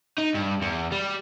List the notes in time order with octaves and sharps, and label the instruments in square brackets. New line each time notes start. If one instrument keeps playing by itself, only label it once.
[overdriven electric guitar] D#4
G2
E2
G3